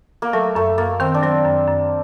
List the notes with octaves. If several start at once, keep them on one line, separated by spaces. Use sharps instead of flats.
A#3
F#3 A3
F#2 A3
F#2 A#3
D#3 C4
D4
F#3 C4
F#2
F#2